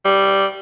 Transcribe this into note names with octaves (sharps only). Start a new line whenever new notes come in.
G3